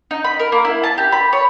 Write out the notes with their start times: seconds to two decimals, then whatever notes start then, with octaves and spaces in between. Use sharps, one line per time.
0.11 D#4
0.24 B5
0.39 A#4
0.52 A#3
0.65 E4
0.84 A5
0.98 G4
1.12 B5
1.33 C#5